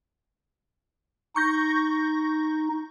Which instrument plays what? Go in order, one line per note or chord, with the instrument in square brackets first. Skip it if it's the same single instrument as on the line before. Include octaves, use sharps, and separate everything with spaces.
[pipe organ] D#4 [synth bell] C#6 G6 A#6